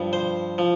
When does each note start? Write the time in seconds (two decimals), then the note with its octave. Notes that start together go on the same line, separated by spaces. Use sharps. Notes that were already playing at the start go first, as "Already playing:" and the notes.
Already playing: G2 F3
0.13 C5
0.58 F3